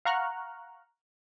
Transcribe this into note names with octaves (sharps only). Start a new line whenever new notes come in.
F5 F#5 A#5 C#6 F6 F#6